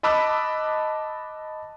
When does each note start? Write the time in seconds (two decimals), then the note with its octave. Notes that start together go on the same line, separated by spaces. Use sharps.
0.03 D#5 A5 B5 D6 E6 F#6